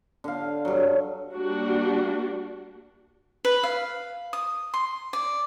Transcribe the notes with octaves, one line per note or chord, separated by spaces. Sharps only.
D3 F5
G2 F#3
G3 A#3 D4 F#4
B4
F5
D#6
C6
D5